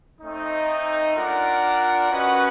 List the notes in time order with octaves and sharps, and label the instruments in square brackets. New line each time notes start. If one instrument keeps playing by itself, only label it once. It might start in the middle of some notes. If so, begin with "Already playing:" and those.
[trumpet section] A3 C4 D#4
D4 F4 A#4 D5 F#5
C#4 F#4 B4 D#5 F#5